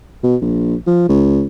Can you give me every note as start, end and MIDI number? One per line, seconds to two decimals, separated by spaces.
0.24 0.36 47
0.41 0.75 34
0.87 1.06 53
1.09 1.47 37